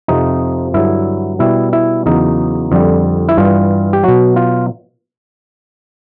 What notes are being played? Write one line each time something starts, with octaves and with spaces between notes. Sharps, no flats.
F2 C3 F3 D#4
G2 D3 F#3 E4
B2 G3 E4
E4
E2 C#3 F#3 D#4
F2 D3 G3
E4
G2 E3 G3 F4
G4
B2 F#3 F#4
F4